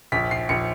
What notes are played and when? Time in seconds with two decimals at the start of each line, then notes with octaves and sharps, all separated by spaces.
0.12 A#1 B6
0.31 C7
0.49 A#1 C#7